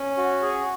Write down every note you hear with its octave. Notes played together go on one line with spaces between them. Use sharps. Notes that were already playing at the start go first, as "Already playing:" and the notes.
Already playing: C#4
F#4
G#4